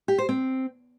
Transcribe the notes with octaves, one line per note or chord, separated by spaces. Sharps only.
G4
C5
C4